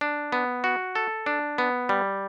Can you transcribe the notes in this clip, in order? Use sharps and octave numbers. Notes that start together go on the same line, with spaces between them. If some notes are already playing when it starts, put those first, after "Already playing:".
D4
B3
F#4
A4
D4
B3
G3